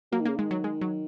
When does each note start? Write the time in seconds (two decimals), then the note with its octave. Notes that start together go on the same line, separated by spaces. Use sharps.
0.12 F#3 A#3
0.20 D#3
0.26 C#3 A#3
0.36 D#3 G#3
0.51 F#3
0.64 G#3
0.82 F#3